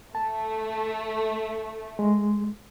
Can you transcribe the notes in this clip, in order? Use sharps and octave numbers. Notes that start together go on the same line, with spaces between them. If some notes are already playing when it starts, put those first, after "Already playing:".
A3 A5
G#3